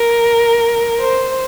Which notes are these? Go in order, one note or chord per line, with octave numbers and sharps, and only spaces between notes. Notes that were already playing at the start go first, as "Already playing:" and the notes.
Already playing: A#4
C5